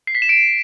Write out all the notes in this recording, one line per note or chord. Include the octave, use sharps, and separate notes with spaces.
C7
B6
E7
D7